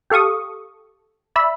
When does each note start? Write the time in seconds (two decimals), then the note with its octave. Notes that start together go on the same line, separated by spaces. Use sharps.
0.10 G4 A4 F5 C#6 D#6
1.36 D5 E5 B5 E6